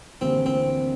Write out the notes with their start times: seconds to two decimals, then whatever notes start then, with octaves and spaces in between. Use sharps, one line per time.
0.21 D2 C3 E3 A#3 C4
0.46 C4